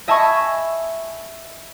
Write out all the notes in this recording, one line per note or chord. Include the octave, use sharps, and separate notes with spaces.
D#5 E5 G#5 A5 B5 C#6